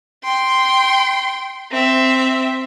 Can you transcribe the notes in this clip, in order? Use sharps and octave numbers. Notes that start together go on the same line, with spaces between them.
G5 C6
C4 E5